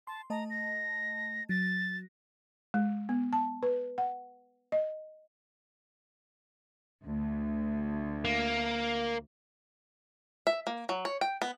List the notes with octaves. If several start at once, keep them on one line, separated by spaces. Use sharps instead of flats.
A5 C6
A3 D#5 A5 A#5
A#6
F#3 A6 A#6
G#3
B3
A5
B4
F#5
D#5
D2
A#3
E5
A#3
F#3
C#5
G5
B3